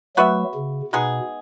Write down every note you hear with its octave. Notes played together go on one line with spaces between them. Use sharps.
F#3 A3 B3 F#4 B4 E5
C#3
B2 G#3 B3 D#4 G#4